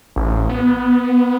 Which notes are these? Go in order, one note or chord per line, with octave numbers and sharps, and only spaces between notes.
A1
B3